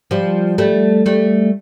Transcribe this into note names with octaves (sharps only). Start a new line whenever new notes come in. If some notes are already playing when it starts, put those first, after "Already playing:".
F3 G3
G3 A3
G3 A3